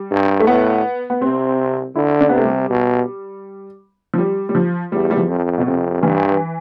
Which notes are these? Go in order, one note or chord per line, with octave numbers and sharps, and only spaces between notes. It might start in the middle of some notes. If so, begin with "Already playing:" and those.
Already playing: G3
G2
A3
A2 B3
B3
C3 C4
D3 E4
D4
B3
C3 A3
G3
B2
F3
G3
G3
F3
E2 G3
G3
F3
F2
B2
F2 C3
G2 E3